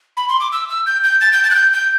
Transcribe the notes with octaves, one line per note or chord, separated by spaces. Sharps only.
B5
C6
D6
E6
E6
G6
G6
A6
G6
A6
F#6
G6
G6